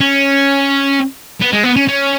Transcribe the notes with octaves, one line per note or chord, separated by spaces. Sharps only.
C#4
B3
G#3
B3
C#4
C#4